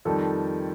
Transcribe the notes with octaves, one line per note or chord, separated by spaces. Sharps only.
F2 D#3 G3 A4